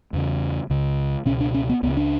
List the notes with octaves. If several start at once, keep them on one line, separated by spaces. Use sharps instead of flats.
E2 C#3
C#2 C#3
C#2 B2 C#4
D4
C#4
B3
C#2 C#3 B3
D4